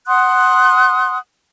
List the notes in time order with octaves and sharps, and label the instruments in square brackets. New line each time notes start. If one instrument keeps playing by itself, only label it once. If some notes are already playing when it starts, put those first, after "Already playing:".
[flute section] F#5 C6 D#6 F#6